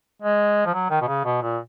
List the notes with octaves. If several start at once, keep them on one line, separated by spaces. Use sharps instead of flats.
G#3
F3
F#3
D#3
B2
C#3
B2
A#2